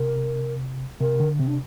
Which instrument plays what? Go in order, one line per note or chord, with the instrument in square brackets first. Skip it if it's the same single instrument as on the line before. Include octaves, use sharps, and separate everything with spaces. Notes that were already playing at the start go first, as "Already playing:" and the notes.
Already playing: [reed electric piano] C3 [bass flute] A#4
[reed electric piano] C3 [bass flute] A#4
[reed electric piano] D3
[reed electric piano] C3 [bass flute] C4
[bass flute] D4